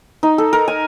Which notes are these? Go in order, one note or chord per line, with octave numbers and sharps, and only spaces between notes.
D#4
A4
A#4
G#5